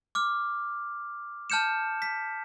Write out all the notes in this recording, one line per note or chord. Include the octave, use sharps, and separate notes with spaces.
D6 F6
A5 F6 G6 C#7 E7
B6